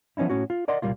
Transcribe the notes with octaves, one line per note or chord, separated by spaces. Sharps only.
F3 B3 C#4 D#4 E4
A2 C#4 F#4
F4
A#4 D5 D#5 F#5 C6
C2 A#2 G3 A#3 F4